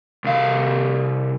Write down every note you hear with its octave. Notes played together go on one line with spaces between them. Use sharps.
C2 F5